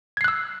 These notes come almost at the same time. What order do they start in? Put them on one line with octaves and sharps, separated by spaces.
G#6 C7 F#6 E6